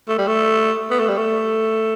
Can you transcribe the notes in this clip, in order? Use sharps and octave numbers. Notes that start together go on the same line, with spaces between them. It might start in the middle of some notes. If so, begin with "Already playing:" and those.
A3
G3
A3
B3
A3
G3
A3